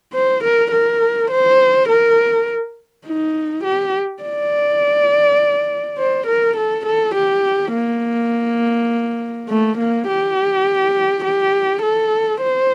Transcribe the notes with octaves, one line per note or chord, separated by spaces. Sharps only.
C5
A#4
A#4
C5
A#4
D#4
G4
D5
C5
A#4
A4
A4
G4
A#3
A3
A#3
G4
G4
A4
C5